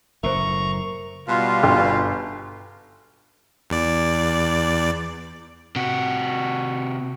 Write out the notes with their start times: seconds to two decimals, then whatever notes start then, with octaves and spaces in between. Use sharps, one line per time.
0.23 F#1 A2 A#4 C5 E5 A#5 C#6
1.28 B2 G3 F4
1.63 G1
3.70 E2 D5
5.76 C3 F#4